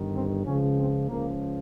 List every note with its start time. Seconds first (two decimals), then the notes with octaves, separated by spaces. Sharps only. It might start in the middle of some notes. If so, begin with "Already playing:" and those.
Already playing: G1 G2 D#3
0.15 C4
0.46 C#2 C#3 F3 C#4
0.78 C4
1.09 C#2 C#3 F3 A#3